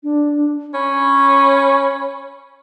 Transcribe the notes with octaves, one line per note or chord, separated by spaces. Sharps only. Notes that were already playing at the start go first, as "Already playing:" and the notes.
D4
C#4 B5